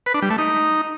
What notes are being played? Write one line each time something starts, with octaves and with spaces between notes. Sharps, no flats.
B4
D4
G3
A3
D#4